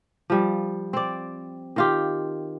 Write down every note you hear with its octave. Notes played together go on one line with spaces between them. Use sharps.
F3 G3
C4 D5
D#3 F4 G4